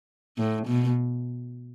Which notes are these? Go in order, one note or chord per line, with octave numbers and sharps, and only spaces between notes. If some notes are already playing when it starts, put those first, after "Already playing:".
A2
B2